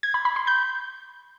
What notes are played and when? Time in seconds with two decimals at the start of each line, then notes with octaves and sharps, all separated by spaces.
0.03 G#6
0.14 B5
0.25 B5
0.36 C6
0.47 G6